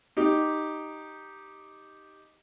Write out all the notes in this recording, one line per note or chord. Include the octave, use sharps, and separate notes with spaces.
D#4 G4